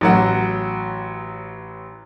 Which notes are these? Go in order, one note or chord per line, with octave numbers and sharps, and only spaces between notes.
A1 F#3 F#5